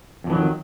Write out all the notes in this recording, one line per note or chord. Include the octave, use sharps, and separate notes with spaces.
F2 C3 D#3 E3 F#3